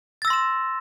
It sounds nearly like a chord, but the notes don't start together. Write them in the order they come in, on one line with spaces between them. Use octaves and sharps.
A6 E6 A#6 C6 E7